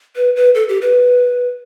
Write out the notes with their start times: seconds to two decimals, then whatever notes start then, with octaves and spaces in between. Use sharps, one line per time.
0.16 B4
0.36 B4
0.55 A4
0.69 G4
0.82 B4